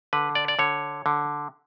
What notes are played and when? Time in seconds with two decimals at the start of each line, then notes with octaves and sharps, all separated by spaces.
0.13 D3 B4
0.35 D5
0.48 D5
0.59 D3 C#5
1.06 D3